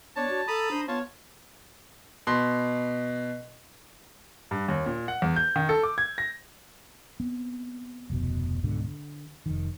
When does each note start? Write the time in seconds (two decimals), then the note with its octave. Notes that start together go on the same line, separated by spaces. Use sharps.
0.17 B3 D4 C#5 A5
0.29 F#4
0.48 A4 A#5 B5 D#6
0.71 D4 C5
0.88 B3 F4 C#5 A5
2.27 B2 C6
4.51 G2
4.68 D#2
4.86 A#2
5.08 F#5
5.22 E2
5.36 G6
5.56 D#3
5.69 A4
5.83 D6
5.98 G#6
6.18 A#6
7.20 B3 C4
8.10 F1 D2 B2
8.63 C#2 G#2 B2 D3
8.84 D3
9.46 F1 D#3